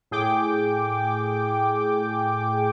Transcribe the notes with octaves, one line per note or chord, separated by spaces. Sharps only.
A2 G#4 G5 D6